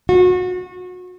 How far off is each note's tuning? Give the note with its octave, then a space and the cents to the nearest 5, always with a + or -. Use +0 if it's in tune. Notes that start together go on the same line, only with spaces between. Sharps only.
F#4 -30